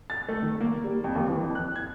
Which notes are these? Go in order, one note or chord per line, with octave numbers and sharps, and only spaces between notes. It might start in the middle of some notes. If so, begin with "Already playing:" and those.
A6
A3
D#3
A#3
G3
F2
D#2
E3
F2
F#6
G#6